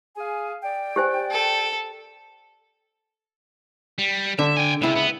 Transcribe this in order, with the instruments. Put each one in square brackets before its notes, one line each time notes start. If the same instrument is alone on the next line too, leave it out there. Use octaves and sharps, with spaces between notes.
[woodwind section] G#4 F5 G#5
D5 G5
[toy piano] G4 C5 G#5
[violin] A4
[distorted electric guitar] G3
[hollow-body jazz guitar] D3 [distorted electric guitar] E5
[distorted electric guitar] G5 G#5
[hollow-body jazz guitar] C#2 E4 [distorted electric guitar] C3
[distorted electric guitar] B3